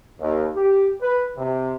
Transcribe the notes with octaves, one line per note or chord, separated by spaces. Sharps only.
D#2
G4
B4
C3